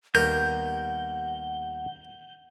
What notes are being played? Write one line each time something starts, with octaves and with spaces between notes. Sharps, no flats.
D#2 G3 B3 A#4 F#5 G6